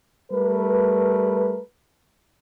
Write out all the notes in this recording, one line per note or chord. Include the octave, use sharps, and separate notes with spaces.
G3 A3 A#4 B4